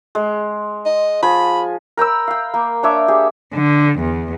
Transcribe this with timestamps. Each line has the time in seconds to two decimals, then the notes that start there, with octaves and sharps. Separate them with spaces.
0.15 G#3
0.86 D#5
1.22 F3 G#5 B5
1.97 A#4 G5 B5 E6
2.28 F5 G5
2.54 A#3
2.83 D4 C#5 E5 D6
3.08 G4 G#4
3.53 D3
4.00 E2